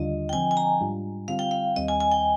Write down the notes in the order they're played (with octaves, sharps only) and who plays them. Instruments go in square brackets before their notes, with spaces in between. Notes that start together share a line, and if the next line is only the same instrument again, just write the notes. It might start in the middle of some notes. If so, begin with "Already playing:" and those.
Already playing: [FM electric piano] D#2 D3 G3 D4 F4 [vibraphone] D#5
[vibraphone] G5
[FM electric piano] D3 F3 C4 [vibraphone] G#5
[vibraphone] G#5
A#5
[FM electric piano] G#2 G3 D4 F4
[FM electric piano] D3 G3 C4 F4 [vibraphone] F5
[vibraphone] G5
F5
[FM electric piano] D#2 D#3 G3 C4 [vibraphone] D#5
[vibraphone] G#5
G#5
G5